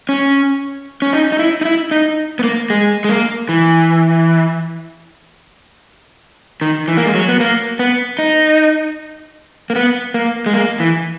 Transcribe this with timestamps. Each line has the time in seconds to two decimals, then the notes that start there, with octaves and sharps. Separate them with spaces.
0.09 C#4
1.02 C#4
1.13 D#4
1.32 D#4
1.39 E4
1.61 D#4
1.65 E4
1.91 D#4
2.39 B3
2.44 A#3
2.70 G#3
3.04 G#3
3.09 A#3
3.49 E3
6.61 D#3
6.88 E3
6.97 A#3
7.06 G#3
7.15 F#3
7.29 B3
7.40 A#3
7.79 B3
8.19 D#4
9.70 A#3
9.76 B3
10.14 A#3
10.46 G#3
10.54 A#3
10.80 E3